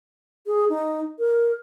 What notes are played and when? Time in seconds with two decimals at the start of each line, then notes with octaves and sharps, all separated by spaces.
0.46 G#4
0.69 D#4
1.19 A#4